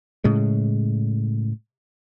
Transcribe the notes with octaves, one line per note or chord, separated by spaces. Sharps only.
A2 C#3 G#3